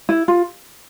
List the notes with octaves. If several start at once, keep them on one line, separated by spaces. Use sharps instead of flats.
E4
F4